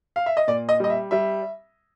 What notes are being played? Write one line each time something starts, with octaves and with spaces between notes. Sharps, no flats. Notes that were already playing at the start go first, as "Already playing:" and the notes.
F5
E5
D#5
A#2 D5
D#5
G3 D#5
E5
G3 E5